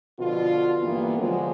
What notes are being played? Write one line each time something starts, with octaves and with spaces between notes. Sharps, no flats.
B2 D3 F3 F4
G2 E3 A#3 B3
D3 F3 F#3 G#3